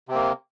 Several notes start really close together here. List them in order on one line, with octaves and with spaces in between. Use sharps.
C3 C4 A#3